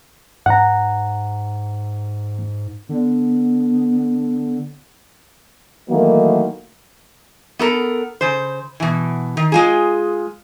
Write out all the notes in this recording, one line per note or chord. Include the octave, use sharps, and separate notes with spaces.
G#2 F#5 A#5
D3 B3
D#3 E3 F#3 A3 A#3
B3 A4 A#4
C#3 C5
B2 E3
D#3
G#3 F4 G#4